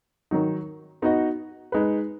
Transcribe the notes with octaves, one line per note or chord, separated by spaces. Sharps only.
D#3 F#3 D#4
B3 D#4 F#4 D#5
G#3 D#4 B4